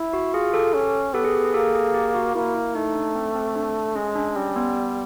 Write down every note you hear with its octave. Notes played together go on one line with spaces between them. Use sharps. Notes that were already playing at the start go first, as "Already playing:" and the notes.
Already playing: E4
F#4
F4 G#4
G4 A4
C#4
B3 G4 A4
G#4
G4
G#4
A#3 G4 A4
G#4
G4
F#4
A#3 E4
E4
A3 D#4
D4
C4
C4
D4
G#3 C#4
D4
G3 C#4
B3